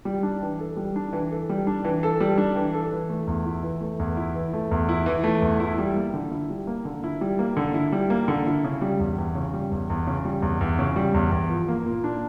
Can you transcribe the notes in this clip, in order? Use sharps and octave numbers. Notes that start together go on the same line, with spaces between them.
G3
D4
E3
A4
G3
D4
E3
A4
G3
D4
E3
A4
G3
D4
E3
A4
E3
A3
E2
E4
E3
A3
E2
E4
E3
A3
E2
E4
E3
A3
E2
E4
G3
A#3
D3
E4
G3
A#3
D3
E4
G3
A#3
D3
E4
G3
A#3
D3
E4
C#3
G3
E2
E2
C#3
G3
E2
E2
C#3
G3
E2
E2
C#3
G3
E2
E2
F3
A#3
A#2
D4